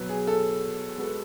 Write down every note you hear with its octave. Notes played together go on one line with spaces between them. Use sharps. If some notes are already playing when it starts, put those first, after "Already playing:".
Already playing: B2 F#3 B3
G#4
A4
G#3 B3 F#4 A4